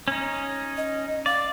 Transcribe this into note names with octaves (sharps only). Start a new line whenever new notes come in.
C#4 D#4
D#5
D5 F5